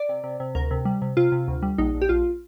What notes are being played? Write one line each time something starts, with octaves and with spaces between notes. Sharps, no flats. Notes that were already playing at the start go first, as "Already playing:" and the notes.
Already playing: D5
C3
C3
C3
D2 A#4
C3
G3
C3
C3 F4
C3
D2
G3
A#1 D#4
A#1
G4
A#1 F4